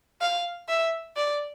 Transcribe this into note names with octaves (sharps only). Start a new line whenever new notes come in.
F5
E5
D5